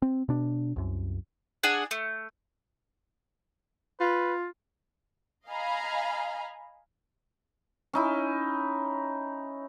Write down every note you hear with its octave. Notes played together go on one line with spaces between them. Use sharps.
C4
B2 D4
C2 F#2
D4 G#4 F#5 G#5
A3
F4 B4
D#5 F5 G#5 A#5 B5
C#4 D#4 E4